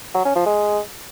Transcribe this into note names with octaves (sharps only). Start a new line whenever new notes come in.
F#3
C#4
F3
G#3